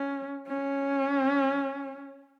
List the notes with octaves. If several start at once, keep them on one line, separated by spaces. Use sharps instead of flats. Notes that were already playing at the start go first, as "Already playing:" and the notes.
Already playing: C#4
C#4